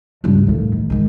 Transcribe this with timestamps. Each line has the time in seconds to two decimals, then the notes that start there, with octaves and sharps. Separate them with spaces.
0.24 C#2 G2
0.47 D#2 A2
0.73 D#3
0.90 G#2 D#3